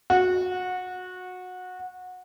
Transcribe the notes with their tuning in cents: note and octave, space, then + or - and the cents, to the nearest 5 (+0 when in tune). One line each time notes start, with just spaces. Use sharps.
F#4 -20